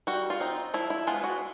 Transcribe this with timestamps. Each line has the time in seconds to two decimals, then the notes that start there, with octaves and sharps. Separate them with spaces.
0.07 G3 F#4
0.30 F4
0.40 C4 D#4
0.74 F3 E4
0.90 E4
1.07 G#3 B3 F4
1.24 F#4